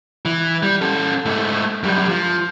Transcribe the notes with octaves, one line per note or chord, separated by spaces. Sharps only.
E3
G3
C#4 A4
G#2 A3
F#2 G3
F3